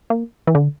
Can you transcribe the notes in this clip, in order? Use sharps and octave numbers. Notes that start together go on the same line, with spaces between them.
A#3
E3
D3